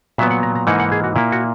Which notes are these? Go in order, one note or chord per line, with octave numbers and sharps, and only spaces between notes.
A#2 F#3 B3 E5
F#5
A#5
A#5
G#2 E3 A#3 D#4 F#5
F#5
G#4
F#4
A#2 A#3 E4
F#4